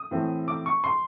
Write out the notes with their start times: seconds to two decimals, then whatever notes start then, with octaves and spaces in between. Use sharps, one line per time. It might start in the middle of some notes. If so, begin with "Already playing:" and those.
Already playing: D#6
0.11 A2 E3 A3 C4
0.48 D6
0.66 C#6
0.84 C6